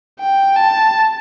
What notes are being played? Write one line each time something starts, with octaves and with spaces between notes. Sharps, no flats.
G5
A5